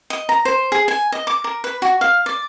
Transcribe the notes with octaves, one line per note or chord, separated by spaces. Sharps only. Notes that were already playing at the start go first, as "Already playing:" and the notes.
D#5
A#5
C5
G#4
G#5
D#5
D6
A#4
B4
F#4
F5
D5